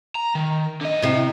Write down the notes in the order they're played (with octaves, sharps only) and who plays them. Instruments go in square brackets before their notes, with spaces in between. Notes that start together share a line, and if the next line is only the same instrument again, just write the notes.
[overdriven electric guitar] A#5
D#3
D3 D#5
[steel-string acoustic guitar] A2 C3